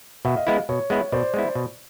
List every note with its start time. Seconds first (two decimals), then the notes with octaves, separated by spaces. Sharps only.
0.25 B2 E5 F#5
0.36 D#5 F5
0.46 G#3 B3 E4 D#5 F5
0.69 B2 C#5
0.90 G#3 B3 E4
1.12 B2 C5 D5
1.34 G#3 B3 E4
1.55 B2